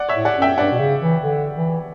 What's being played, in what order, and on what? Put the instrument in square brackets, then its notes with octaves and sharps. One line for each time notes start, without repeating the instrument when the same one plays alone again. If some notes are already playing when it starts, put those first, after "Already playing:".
Already playing: [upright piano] D5 F#5
C#5 E5
[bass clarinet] A2
[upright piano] D5 F#5
[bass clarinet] F#2
[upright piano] E5 G5
[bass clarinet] G2 [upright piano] D5 F#5
[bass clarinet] B2
C#3
E3
D3
E3